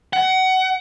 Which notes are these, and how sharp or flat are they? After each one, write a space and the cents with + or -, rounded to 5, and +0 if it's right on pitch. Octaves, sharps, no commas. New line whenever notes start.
F#5 +25